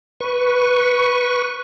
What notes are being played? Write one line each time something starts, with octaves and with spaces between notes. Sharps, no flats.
B4 C#6